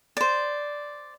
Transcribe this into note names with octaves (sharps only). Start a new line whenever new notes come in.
C5 D5